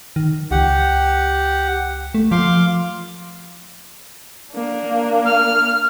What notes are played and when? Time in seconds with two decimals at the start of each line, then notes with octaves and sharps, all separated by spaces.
0.16 D#3
0.51 C#2 G4 F#5
2.14 A3
2.32 F3 F5 C6 D6
4.53 A#3 D4
5.25 F6